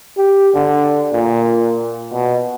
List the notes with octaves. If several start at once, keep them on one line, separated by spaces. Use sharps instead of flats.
G4
D3
A#2
B2